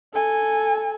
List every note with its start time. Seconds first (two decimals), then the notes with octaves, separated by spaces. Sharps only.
0.13 A4 G#5